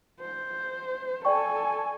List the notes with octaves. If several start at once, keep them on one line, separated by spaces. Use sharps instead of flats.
C5
A4 D5 G5 G#5 C#6